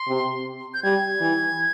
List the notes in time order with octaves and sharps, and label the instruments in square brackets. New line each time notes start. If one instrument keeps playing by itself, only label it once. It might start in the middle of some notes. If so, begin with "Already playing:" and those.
Already playing: [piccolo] C6
[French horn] C3
[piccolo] G6
[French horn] G3 [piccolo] G#6
[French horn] E3